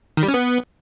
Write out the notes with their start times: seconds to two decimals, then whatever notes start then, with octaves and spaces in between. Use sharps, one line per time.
0.17 D#3
0.23 G3
0.28 C#4
0.34 B3